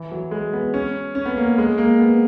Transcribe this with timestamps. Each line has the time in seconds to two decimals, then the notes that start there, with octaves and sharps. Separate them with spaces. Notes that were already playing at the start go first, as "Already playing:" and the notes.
Already playing: E3
0.12 F#3
0.31 G#3
0.53 B3
0.74 C#4
1.15 C#4
1.25 B3
1.37 A#3
1.58 G#3
1.78 A#3
1.99 B3